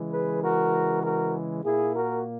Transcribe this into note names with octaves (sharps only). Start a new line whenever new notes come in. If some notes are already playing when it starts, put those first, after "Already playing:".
Already playing: C#3 E3 G#3
G#4 B4
F#4 A#4
F#4 A#4
A#2 A#3 E4 G#4
F#4 A#4